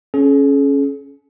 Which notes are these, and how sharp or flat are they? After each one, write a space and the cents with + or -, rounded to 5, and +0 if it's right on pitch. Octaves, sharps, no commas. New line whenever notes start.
C#4 -5 G#4 +45